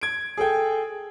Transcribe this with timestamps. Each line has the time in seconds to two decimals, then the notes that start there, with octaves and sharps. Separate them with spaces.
0.01 G#6 D7
0.37 G#4 A4 G5